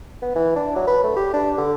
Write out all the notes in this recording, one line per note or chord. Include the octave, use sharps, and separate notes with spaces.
B3
E3
D4
F#3
B4
A3
G4
D4
D3